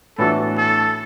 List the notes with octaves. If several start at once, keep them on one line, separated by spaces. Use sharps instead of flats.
A2 E3 B3 D4 F#4 A4
A4